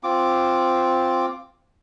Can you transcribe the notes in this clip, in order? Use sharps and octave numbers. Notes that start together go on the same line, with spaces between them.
C4 F4 D6